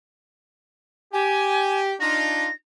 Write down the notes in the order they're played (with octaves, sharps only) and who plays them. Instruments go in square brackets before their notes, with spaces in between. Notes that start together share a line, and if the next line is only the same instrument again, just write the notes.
[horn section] G4 [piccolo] G#5
[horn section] D4 D#4 F4 [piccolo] A#6